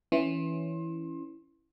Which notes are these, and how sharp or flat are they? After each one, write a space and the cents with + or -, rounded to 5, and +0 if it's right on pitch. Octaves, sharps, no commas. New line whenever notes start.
E3 +0 C#4 +0 C6 +30